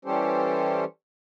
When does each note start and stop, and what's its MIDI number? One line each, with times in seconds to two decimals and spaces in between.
0.05 0.84 52
0.05 0.84 55
0.05 0.84 61
0.05 0.84 67
0.05 0.84 69
0.05 0.84 72